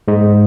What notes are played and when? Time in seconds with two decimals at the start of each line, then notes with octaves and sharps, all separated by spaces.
0.08 G#2 G#3